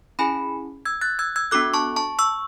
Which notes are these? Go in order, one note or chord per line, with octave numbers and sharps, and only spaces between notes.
C#4 E4 G#4 G#5 B5
E6 G#6
F#6 A6
E6 G#6
E6 G#6
B3 D4 F#4 A4 D6 F#6
A5 C#6
A5 C#6
C#6 E6